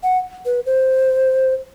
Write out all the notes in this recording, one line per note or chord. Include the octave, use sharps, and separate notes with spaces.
F#5
B4
C5